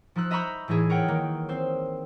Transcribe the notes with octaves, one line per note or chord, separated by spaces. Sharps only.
F3 D#4 E6 F#6
D#5 E5 A#5 B5 C#6 G6
A2 E3 D#4 E4 G#4
A#4 C#5 F#5 G5
D#3 A#3
C4 C5